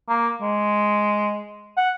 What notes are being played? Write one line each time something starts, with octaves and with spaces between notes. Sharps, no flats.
A#3
G#3
F#5